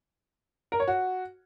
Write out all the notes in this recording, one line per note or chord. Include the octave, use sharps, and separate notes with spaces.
A#4
C#5
F#4